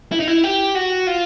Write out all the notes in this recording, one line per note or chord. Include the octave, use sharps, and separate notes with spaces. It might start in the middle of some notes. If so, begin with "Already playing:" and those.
E4
D#4
E4
G4
F#4
F4